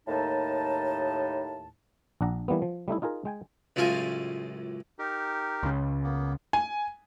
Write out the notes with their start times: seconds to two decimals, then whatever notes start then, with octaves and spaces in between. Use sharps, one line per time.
0.07 D#2 A2 D#4 A5
2.21 A#1 D4 F#5 A#5
2.48 E3 G3 A#3 B3
2.62 F3
2.88 G3 A3 D#4 E4
3.02 D#4 F4 G#4 A#4
3.25 G#3 G5 G#5
3.76 C#2 F#2 A2 F4 F5 G#5
4.99 D#4 G4 A#4
5.63 C#2 C#3
6.03 A#3 B3
6.53 G#5